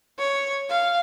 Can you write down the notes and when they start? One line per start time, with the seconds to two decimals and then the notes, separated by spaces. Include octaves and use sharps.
0.19 C#5
0.69 F5